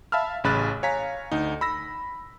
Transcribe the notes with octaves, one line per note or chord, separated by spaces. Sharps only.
E5 F5 A5 B5 E6 F6
A1 C#3 B5 F#6 A6
C#5 F5 G#5 A#5 B6
D2 D#4
B5 E6 A#6